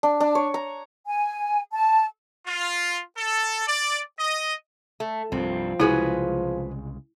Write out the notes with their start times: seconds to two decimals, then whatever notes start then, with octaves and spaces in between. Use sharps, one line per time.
0.03 D4
0.20 D4
0.35 C#5
0.54 A#5
1.07 G#5
1.73 A5
2.47 F4
3.17 A4
3.68 D5
4.19 D#5
5.00 A3
5.32 C2 G2 F3 C4
5.80 C2 C#3 G#3 E4 F#4 G#4 B4